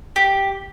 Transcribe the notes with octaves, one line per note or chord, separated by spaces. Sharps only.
G4